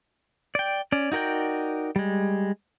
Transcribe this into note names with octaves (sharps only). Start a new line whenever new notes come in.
D5 G5
C#4 D5
D#4 F#4 A#4 D5 G5
G3 G#3